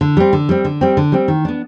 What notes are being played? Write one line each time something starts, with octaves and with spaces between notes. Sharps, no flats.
D3
G3 C4
D3
G3 C4
D3
G3 C4
D3
G3 C4
D#3
B3 D4